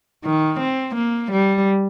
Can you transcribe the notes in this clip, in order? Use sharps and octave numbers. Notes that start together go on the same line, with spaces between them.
D#3
C4
A#3
G3